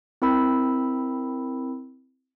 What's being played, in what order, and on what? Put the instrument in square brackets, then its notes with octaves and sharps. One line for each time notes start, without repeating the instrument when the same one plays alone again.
[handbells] C4 E4 A#4 G5 B5 E6